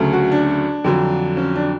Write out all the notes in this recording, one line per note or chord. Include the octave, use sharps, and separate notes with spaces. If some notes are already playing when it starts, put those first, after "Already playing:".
Already playing: D2 C#3 F#3 A3
F#4
D4
F2 D3 F#3
C#4
D4